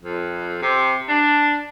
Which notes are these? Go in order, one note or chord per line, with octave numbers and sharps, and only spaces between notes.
F2
C3
D4